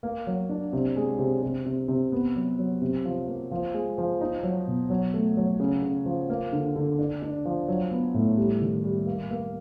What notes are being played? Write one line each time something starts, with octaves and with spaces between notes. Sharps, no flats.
A#3
F#3
D4
C3
G#3
C3
C3
C3
C3
B3
F#3
F#3
C3
F3
A#3
F3
G#3
F3
D#4
F#3
B2
F#3
A3
F#3
C#3
C#3
F3
A#3
D3
D3
D4
D4
F3
F#3
B3
A2
G3
D#3
G3
A#3
A#3